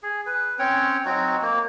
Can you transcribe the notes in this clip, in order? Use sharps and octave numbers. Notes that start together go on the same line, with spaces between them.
G#4
B4
C4 C#4 C#5 G5
F#3 C4 D#4 F#4
A#3